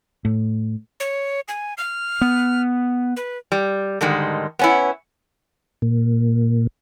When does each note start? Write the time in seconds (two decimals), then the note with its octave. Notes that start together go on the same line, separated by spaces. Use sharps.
0.25 A2
1.00 C#5
1.48 G#5
1.78 F6
2.21 B3
3.16 B4
3.52 G3
4.01 G#2 D3 D#3 G3 G#3
4.59 B3 C#4 E4
5.82 A#2